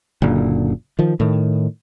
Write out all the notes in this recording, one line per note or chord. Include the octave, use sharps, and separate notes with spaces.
F#1 A#2 D3
D#3 F3
A2 D#3